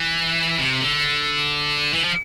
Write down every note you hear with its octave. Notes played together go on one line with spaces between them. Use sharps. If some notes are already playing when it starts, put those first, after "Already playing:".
Already playing: E3
C3
D3
E3
F3